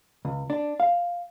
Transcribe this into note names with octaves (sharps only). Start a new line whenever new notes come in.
C#2
D4
F5